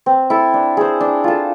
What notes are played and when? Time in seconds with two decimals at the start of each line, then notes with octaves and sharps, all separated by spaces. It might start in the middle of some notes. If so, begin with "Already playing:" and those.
0.06 C4
0.30 E4 A4
0.54 D4
0.77 G#4 C5
1.01 D4
1.24 F4 A4